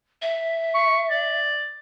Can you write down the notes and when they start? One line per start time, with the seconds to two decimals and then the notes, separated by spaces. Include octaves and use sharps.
0.22 E5
0.74 C#6
1.10 D5